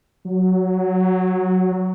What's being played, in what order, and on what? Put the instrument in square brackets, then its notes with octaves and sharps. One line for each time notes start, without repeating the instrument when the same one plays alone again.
[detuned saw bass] F#3